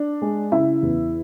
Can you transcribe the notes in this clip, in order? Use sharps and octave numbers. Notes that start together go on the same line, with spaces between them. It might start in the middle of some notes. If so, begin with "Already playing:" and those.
Already playing: D4
G#3
C#3 E4 E5
E2